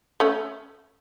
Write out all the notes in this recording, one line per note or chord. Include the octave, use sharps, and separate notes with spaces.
A3 C#4